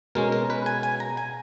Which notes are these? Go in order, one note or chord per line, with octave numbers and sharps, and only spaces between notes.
B2 G#3 C#4 A#4
A#4
B4
G#5
G#5
A#5
G#5